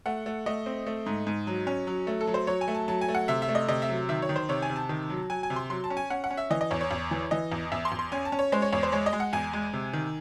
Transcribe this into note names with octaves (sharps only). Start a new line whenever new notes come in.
A3 F#5
A3
A3 D#5
C4
A3
G#2
G#2
F#3
C#4
F#3
A3
A4
F#3
C5
F#3 C#5
G#5
A3
A5
F#3 A5
G#5
A3
F#5
C3 E5
E5
A3
D#5
C3 D#5
E5
F#3
D#3 E5
C#5
D#3
C5
C3 C#5
G#5
C3
A5
D#3
F#3
F#3 G#5
G#5
C3
C6
F#3 C6
A5
C#4
G#5
C#4 F#5
F#5
C#4
E5
E3 D#5
D#5
E2 C#5
C#5
E2
E3
E3 D#5
E2
E2 E5
C6
E2
C6
C#4 G#5
A5
C#4
C#5
G#3 C5
C#5
E2 C#5
C5
G#3 C#5
D#5
G#3
F#5
E2 G#5
G#3
C3
D#3